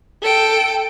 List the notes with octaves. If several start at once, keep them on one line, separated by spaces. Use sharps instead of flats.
A4 G5